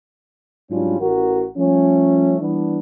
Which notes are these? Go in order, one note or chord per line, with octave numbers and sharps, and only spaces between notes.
G#2 F#3 G3 C#4 D4 F4
A1 F#4 A#4
F3 G3 A3 C#4
E3 G3 B3 D4